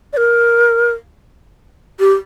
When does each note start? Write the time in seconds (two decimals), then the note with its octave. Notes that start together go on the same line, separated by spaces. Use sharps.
0.13 D5
0.17 A#4
2.00 G4